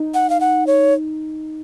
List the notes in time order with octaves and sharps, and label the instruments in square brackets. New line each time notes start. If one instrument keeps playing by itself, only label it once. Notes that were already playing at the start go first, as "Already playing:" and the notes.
Already playing: [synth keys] D#4
[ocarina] F#5
F5
F#5
C#5